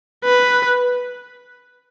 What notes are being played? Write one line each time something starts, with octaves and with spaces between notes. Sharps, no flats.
B4